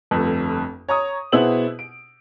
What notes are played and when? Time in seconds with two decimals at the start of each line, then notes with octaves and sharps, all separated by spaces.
0.11 G1 F2 A3 B4
0.89 C#5 A#5 C#6 D#6
1.32 B2 B3 E4 G#4 C5 F#7
1.79 D7